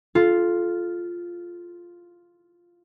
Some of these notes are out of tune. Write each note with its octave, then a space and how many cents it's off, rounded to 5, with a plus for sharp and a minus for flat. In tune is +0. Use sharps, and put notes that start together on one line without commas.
F4 +0 A4 -25